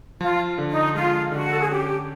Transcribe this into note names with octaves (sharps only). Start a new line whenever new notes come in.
F3 F4
D3
D#4
G#3 F4
D3 F#4
A4
G#4
C#4 G4